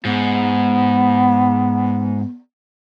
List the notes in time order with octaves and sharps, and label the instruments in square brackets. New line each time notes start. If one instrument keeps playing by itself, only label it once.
[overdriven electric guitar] G#2 [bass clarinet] B3